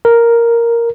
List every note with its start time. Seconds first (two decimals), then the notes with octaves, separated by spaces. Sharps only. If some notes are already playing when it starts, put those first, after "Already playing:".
0.05 A#4